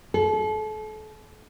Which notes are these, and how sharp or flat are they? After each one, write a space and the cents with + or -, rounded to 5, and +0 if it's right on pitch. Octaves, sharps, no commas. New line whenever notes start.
A4 -35